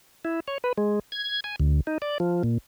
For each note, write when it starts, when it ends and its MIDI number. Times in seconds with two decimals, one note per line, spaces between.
0.25 0.40 64
0.48 0.58 73
0.64 0.73 71
0.78 1.00 56
1.12 1.40 92
1.44 1.56 80
1.60 1.80 38
1.87 1.98 63
2.02 2.18 74
2.20 2.43 53
2.43 2.58 46